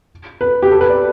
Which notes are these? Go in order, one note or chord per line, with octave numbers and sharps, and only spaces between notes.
B4
G4
A4
B4
D5